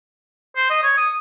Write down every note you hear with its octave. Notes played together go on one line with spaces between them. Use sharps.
C5
D#5
C#5
D#6